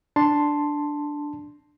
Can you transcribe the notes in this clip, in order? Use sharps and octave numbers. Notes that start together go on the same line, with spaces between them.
D4 A5 C6